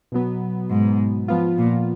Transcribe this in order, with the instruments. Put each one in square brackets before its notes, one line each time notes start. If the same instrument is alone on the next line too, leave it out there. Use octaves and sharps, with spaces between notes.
[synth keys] B2 F#3 B3
[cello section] G#2
[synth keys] F3 B3 F4
[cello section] A#2